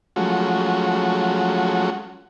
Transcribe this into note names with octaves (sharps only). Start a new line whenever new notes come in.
F3 F#3 G#3 A3 C#4 F#4